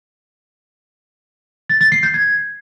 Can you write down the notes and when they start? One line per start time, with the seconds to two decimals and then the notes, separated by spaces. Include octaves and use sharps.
1.69 A6
1.81 A6
1.92 C7
2.03 G6
2.14 G#6